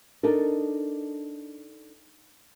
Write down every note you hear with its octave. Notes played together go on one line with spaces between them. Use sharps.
D4 D#4 A4 A#4